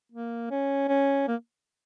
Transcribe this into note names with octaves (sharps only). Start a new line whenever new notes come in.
A#3
C#4
C#4
A#3